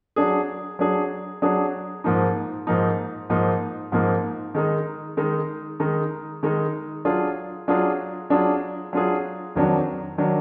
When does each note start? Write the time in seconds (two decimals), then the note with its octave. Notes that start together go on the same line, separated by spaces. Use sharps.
0.16 F#3 D4 G#4
0.79 F#3 D4 G#4
1.42 F#3 D4 G#4
2.04 G#2 F3 A#3 D#4
2.67 G#2 F3 A#3 D#4
3.30 G#2 F3 A#3 D#4
3.92 G#2 F3 A#3 D#4
4.55 D#3 G#3 D#4
5.17 D#3 G#3 D#4
5.80 D#3 G#3 D#4
6.43 D#3 G#3 D#4
7.05 F#3 D4 F4 G#4
7.68 F#3 D4 F4 G#4
8.30 F#3 D4 F4 G#4
8.93 F#3 D4 F4 G#4
9.55 F2 D#3 F#3 D4
10.18 D#3 F#3 D4